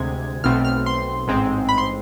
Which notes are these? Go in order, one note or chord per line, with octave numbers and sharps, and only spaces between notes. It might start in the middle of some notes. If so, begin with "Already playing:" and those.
Already playing: D2 C3 G#3 G#6
B1 B2 A3 C4 F6
F6
C6
A1 G#2 G#3 C4
B5
C6